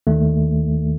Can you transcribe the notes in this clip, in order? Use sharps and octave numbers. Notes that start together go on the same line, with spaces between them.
D#2 D#3 A3